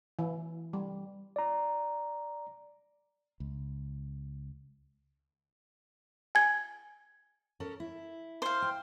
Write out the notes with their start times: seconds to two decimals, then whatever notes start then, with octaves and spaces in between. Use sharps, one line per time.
0.19 E3
0.73 G3
1.36 D5 A#5
3.40 C#2
6.35 G#5 G#6
7.60 C#4 A4 A#4
7.80 E4
8.42 C5 F5
8.62 G5